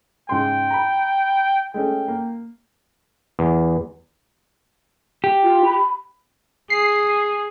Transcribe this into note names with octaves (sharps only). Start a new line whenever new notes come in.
G#2 C#3 G5 C6
A#5 B5
G#3 A3 C#4 G5
A#3
E2
G4
F4
B5
G#4 C7